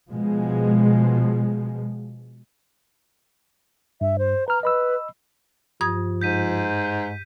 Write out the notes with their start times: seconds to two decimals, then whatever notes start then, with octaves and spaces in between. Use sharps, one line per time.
0.11 B2 F3 G#3
4.01 G2 E5
4.19 C5
4.48 B4 A#5 F6
4.63 B4 D#5 B5 E6
5.81 G2 F3 D#6 G#6
6.21 G#2 G6 B6 D#7